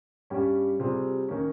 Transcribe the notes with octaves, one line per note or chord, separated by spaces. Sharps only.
G2 G3 C#4 G4
C3 G3 C4 F4 G#4
D#3 A#3 C#4